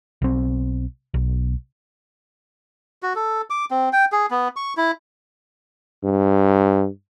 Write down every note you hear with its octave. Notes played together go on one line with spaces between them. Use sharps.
B1 C4
B1
F#4
A4
D6
C4
G5
G#4
B3
C#6
E4
G2